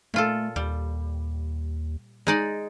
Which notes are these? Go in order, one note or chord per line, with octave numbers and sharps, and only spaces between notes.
A#2 A3 F4 A4
D#2 G3
G#3 D#4 D5